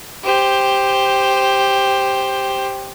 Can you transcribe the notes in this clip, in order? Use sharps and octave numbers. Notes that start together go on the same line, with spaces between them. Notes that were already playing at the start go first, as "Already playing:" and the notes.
G4 C5